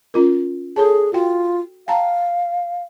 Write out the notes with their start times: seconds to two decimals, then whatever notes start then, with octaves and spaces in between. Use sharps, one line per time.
0.14 C#4 F4 A#4
0.76 G#4 A4 C#5 A5
1.13 F4 F#4 G5
1.88 F5 G5 A5 A#5